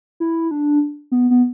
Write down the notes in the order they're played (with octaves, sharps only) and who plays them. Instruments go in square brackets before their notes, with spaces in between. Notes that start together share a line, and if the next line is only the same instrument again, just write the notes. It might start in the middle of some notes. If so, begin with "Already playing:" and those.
[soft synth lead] E4
D4
B3
B3